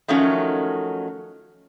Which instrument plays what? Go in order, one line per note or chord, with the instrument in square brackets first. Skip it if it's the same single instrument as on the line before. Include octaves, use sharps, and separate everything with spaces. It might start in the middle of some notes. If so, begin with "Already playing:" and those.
[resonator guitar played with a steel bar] D#3 F3 F#3 A3 C#4 D#4